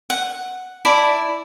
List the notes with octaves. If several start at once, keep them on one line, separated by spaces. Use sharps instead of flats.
F#5
E4 D5 A5 B5